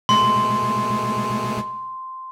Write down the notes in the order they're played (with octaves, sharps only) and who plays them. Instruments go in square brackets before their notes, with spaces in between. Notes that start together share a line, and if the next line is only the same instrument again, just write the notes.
[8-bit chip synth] B2 G#3 A3 [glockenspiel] C6